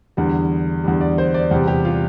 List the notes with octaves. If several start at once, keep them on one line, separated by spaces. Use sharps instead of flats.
E2 D3 G3
E2 D3 G3
D5
C5
D5
E2 C3 G3 G4
G4
F4